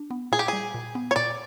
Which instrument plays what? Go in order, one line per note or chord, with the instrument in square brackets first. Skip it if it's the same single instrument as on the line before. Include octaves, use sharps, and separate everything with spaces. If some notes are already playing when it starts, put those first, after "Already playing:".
Already playing: [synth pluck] D4
B3
[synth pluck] A#2 [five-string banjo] G#4
[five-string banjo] G4
[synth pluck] G3 [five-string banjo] G#4
[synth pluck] A#2
B3
[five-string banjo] C#5
[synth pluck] A#2 [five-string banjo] D5